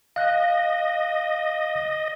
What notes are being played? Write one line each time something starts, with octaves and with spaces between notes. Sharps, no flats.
D#5 F5 F#6 A#6